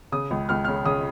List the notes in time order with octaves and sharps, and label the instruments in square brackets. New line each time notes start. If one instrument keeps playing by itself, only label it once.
[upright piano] C#3 D#6
C#2
C#2 F6
C#3 F6
C#3 D#6